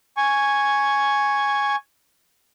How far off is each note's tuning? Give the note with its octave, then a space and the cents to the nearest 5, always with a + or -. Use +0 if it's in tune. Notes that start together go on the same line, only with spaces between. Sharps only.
G#5 +0 C#6 +0